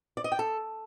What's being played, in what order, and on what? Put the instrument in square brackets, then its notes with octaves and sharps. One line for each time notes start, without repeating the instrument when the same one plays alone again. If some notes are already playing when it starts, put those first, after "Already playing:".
[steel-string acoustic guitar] D5
D#5
G5
A4